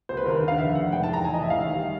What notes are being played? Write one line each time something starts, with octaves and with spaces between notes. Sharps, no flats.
C2 C5
B4
D#2 A#4
B4
D3
F5
F1 E5
F1 F#5
G#2 G5
A5
E3 A#5
A1 G#5
D#5
A1 E5
F5
D#3
G3